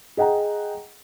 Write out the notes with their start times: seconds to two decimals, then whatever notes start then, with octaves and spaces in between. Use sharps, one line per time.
0.17 G#4 D#5 F#5 G5 A#5